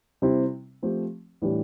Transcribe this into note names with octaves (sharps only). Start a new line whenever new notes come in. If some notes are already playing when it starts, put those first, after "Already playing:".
C3 G3 C4 E4
F3 A3 C4 G4
A2 E3 G3 D4 G4